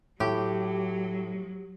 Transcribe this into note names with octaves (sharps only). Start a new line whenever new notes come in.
A2 F#3 G4